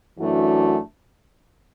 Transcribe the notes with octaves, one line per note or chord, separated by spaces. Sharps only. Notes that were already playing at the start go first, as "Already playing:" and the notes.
F#2 E3 A3 D4 F#4